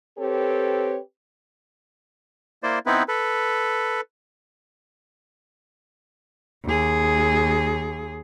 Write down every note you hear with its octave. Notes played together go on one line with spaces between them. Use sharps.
C4 G4 A4 B4 C#5
A#3 E4 C5 D5
B3 C4 D#4 E4 B4
A4 B4
D#2 G#4